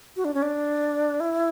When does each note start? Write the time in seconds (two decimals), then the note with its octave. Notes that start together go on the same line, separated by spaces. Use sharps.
0.17 F#4
0.25 D4
0.34 C#4
0.42 D4
1.20 E4